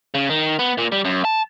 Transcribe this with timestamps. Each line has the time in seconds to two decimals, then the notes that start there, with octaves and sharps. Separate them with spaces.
0.14 C#3
0.30 D#3
0.59 B3
0.78 A#2
0.92 G3
1.05 F#2
1.25 A5